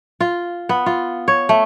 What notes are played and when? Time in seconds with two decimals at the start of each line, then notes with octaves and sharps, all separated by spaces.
0.20 F4
0.69 B3
0.86 F4
1.28 C#5
1.49 A3